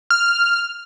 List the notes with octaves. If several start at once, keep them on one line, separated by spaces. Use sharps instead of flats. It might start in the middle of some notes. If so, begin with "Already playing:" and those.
F6